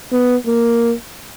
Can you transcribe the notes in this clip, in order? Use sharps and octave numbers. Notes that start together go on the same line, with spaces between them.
B3
A#3